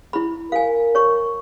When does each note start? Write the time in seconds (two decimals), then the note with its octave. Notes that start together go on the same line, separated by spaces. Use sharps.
0.13 E4 B5
0.52 A#4 F5 G#5
0.95 C#5 C#6